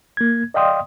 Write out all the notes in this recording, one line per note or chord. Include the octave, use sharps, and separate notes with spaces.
A#3 G#6
D5 D#5 F5 G5 C6 D#6